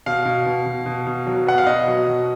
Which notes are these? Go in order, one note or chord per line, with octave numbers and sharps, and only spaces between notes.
B2 F5
B2
B2
B2
B2
B2
F#3
B3 F#5
F5
B2 D#5
F#3
B2